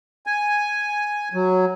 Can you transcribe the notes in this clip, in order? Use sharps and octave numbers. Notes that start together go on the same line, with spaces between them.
G#5
F#3